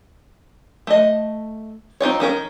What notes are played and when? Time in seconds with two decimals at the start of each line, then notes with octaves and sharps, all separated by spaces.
0.87 A3 D#5
2.00 C4 D#4 F4 C#5
2.20 D#3 C#4 A#4